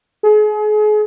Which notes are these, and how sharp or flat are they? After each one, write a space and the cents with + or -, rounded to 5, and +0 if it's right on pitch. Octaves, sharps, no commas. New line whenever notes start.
G#4 +35